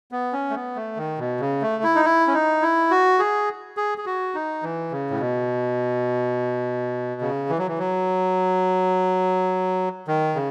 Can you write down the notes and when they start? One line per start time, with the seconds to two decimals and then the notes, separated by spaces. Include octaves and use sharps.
0.12 B3
0.33 C#4
0.50 A3
0.55 B3
0.76 A3
0.97 D#3
1.18 B2
1.40 C#3
1.62 A3
1.84 E4
1.96 D#4
2.05 E4
2.27 C#4
2.34 D#4
2.62 E4
2.91 F#4
3.19 G#4
3.77 G#4
3.98 G#4
4.06 F#4
4.35 D#4
4.63 E3
4.92 C#3
5.11 A2
5.20 B2
7.21 C#3
7.49 E3
7.58 F#3
7.68 E3
7.78 F#3
10.08 D#3
10.35 C#3